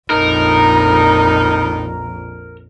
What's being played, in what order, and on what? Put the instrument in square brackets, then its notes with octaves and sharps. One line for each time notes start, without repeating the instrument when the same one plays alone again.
[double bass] A#1 F2 [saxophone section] A2 D#3 D#4 [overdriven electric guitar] A#4 [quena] A#5